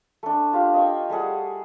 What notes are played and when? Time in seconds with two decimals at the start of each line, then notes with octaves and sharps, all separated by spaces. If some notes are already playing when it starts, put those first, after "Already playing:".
0.23 A3 D4
0.53 F4 G4 F5
0.74 D#5 F5 G5 C#6
1.10 G3 A3 G#4 F#5